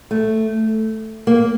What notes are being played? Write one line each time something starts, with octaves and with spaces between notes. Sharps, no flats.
A3
A#3